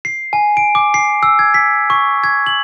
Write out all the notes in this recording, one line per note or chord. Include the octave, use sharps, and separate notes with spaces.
C7
G#5
D7
D6
C7
E6
G#6
B6
C#6
G#6
F#7